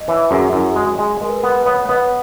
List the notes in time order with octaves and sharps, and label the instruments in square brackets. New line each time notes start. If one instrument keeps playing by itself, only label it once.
[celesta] D#5
[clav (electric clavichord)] E3 [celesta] C#5 E5
[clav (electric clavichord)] F#2 [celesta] G#4
[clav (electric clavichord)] F#2 [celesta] E4
[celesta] G#4
[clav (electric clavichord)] G#3 [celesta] F#4
[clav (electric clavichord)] G#3 [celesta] G#4
[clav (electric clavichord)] G#3 [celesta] A#4
[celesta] B4
A#4
[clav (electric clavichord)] B3 [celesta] B4
[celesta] B4
[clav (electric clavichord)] B3 [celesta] C#5
[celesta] C#5
[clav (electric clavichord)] B3 [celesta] B4 D#5